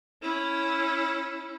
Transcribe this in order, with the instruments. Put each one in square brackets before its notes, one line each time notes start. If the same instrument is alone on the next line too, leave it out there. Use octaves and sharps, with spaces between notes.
[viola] C#4 E4